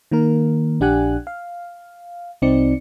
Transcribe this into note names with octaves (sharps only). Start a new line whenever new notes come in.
D#3 A#3 A#4
A#1 D4 G4 F#5 G#5 F#6
F5
C2 C4 D#4 D5 C#7